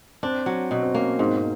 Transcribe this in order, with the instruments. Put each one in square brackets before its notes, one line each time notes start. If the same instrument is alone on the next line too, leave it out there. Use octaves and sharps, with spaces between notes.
[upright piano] C4 [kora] D4
[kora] F#3
B2
[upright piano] C4
[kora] A#3 [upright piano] C#4
[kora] G#2 [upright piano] C4
[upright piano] C4